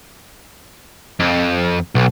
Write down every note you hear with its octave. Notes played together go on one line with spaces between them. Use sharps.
F2
B1